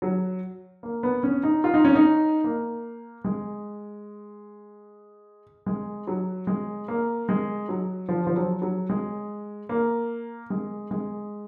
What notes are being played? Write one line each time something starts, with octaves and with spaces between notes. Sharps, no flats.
F#3
A#3
B3
C#4
D#4
F4
D#4
C#4
D#4
A#3
G#3
G#3
F#3
G#3
A#3
G#3
F#3
F3
F3
F#3
F#3
G#3
A#3
G#3
G#3